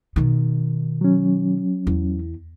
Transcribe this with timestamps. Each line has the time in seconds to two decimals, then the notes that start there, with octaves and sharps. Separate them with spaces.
0.16 B2 D#3
1.01 F#3 C#4
1.87 E2